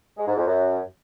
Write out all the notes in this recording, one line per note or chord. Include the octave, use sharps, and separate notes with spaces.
G#3
G#2
F2
F#2